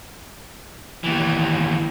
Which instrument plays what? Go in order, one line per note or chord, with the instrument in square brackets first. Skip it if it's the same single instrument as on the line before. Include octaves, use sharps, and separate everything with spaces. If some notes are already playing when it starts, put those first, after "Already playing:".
[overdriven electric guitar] D#2 E3